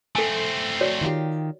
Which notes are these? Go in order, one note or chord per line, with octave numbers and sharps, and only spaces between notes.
A3 C4 A4 G#5
F#4 C#5 D5
D#3 F4 G4